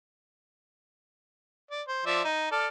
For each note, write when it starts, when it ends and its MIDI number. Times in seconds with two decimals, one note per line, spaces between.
1.71 1.82 74
1.88 2.02 72
2.06 2.22 53
2.06 2.22 74
2.06 2.22 76
2.25 2.50 63
2.52 2.68 69
2.52 2.68 74
2.52 2.68 89